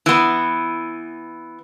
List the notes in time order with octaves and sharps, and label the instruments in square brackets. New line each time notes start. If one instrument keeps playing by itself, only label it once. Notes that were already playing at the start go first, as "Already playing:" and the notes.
[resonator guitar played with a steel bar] E3 B3